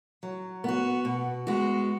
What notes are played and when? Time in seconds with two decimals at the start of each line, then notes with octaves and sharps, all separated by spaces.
0.23 F#3
0.64 B3 F#4
1.05 B2
1.47 G#3 B3 F#4